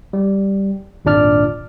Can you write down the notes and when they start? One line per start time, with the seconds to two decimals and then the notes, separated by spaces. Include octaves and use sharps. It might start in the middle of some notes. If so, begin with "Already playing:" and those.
0.13 G3
1.05 G#1 D#2 A#2 D4 D5 F6